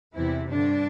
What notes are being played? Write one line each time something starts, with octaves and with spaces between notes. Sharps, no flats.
E2 C3 E3 E4
G2 D3 D4